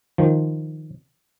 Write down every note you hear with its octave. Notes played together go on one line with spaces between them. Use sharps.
D#3 F3